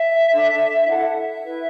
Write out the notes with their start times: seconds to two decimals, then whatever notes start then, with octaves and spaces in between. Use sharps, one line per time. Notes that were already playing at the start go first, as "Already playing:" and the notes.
Already playing: E5
0.29 D4 A4
0.86 E4 A4 F#5
1.08 F#5
1.15 E5
1.43 E4 B4